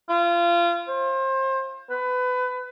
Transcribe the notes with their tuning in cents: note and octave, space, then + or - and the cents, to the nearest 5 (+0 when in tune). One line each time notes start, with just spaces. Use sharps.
F4 -25
C5 +30
B4 +25